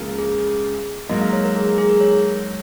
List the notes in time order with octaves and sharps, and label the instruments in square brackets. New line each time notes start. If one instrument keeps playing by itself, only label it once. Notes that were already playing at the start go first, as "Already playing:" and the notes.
Already playing: [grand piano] C#2 C#3 F3 A#3
[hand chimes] G#4
[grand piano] G#2 F#3 A#3 [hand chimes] D#5
[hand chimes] F5
C#5
A#4
G#4
G#4
A#4
C#5